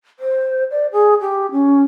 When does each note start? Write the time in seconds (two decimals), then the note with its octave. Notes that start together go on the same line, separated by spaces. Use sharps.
0.19 C5
0.71 D5
0.92 G#4
1.21 G4
1.52 C#4